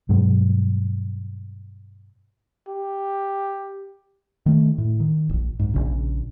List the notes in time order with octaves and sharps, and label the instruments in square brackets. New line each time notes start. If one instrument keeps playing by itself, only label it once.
[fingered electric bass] G2 B2 F#3 G#3
[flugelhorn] G4
[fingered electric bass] D#3 A3
A2
D#3
E1 A#1
B1 G#2
A#1 C#3